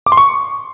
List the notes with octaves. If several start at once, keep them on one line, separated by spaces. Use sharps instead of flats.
D6
C6
C#6